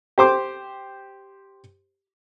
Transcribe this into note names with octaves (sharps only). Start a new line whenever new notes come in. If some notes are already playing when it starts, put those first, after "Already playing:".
G4 C5 D6